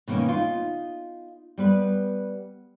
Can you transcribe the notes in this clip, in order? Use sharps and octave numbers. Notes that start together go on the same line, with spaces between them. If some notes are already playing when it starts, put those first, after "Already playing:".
B2 D#3 A#3 C4 C#4
D#4 F4
G3 B3 B4